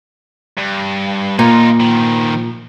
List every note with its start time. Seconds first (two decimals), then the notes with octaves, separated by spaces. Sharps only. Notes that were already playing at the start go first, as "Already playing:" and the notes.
0.57 G2
1.39 A#2 D#4 F4
1.80 D#3 F3